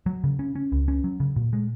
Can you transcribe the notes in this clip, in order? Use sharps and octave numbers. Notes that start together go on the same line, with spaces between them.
F#3
C#3
C#4
C#4
C#2
C#4
F#3
C#3
A#2
G#3